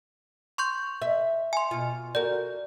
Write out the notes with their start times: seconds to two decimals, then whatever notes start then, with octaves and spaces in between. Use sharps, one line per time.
0.58 C6 C#6 G6
1.02 E5
1.53 G#5 C6
1.71 B2 F4
2.15 F#4 A#4 D5